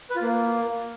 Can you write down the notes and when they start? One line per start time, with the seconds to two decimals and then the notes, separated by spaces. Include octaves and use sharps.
0.10 B4
0.16 F4
0.22 A#3